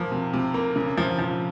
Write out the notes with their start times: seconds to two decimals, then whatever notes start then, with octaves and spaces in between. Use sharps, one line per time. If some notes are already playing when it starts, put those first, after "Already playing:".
Already playing: F3 A#3
0.12 C3
0.33 C3
0.54 A#3
0.76 C#3
0.97 F3
1.19 F3